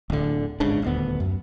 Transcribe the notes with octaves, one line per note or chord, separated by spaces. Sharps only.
D1 D3
G1 G#2 C#3 D4
D#1 D2 B3
F#2